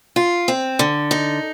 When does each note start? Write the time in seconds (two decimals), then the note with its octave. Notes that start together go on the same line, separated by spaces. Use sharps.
0.16 F4
0.48 C4
0.79 D3
1.11 D#4